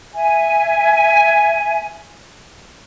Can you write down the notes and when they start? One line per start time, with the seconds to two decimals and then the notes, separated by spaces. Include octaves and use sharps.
0.15 E5 G#5